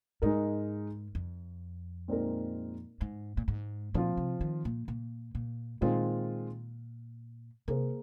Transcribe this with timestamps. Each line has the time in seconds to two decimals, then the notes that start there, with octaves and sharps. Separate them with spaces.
0.22 G#2 G#3 D#4 A#4
1.15 F2
2.08 A#2 G#3 C4 D#4 A#4
3.01 G#2
3.37 A#2
3.48 G#2
3.94 A#2 F3 C4 F4
4.17 C3
4.41 D#3
4.65 A#2
4.88 A#2
5.35 A#2
5.81 A#2 D#3 G#3 C4 F4
7.68 C3 A#3 G#4 C5